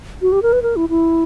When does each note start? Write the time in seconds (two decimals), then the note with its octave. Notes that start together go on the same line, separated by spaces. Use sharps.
0.22 F#4
0.32 G4
0.42 A#4
0.53 B4
0.62 A#4
0.76 E4
0.89 E4